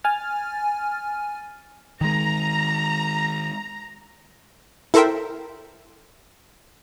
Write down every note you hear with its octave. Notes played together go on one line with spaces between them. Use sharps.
G#5 F6 A6
D#3 G#3 A#5
E4 A4 A#4 C5 E5 G5